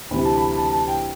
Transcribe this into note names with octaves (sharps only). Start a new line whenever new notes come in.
D2 C3 E3 G3 B5
A5
B5
B5
A5
A5
G5